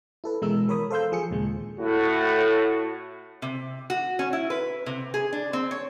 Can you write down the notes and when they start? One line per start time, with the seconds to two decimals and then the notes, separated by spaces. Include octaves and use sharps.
0.24 E4 A4 B4
0.42 B2 E3 G#3 E4 A#4 E6
0.68 E3 A#4 C#5 B5 D#6
0.90 A4 C5 F5 C6 E6 G6
1.12 F3 G#4 C#7
1.31 D#2 A#2 C#3 G#3
1.79 A2 F#4
3.42 C3
3.90 F#4
4.19 C#4
4.33 E4
4.50 B4
4.86 C3
5.14 G#4
5.32 D4
5.53 C4
5.71 C#5